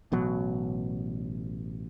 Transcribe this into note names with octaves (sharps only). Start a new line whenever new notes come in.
A1 B2 F#3